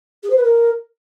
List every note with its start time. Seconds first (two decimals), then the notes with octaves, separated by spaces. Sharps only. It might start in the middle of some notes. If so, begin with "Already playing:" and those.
0.23 G#4
0.29 C5
0.36 B4
0.43 A#4